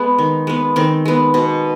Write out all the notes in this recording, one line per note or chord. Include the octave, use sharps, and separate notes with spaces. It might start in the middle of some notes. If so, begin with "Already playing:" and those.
Already playing: G#3 B3
D#3
G#3 B3
D#3 C4
G#3 B3
B2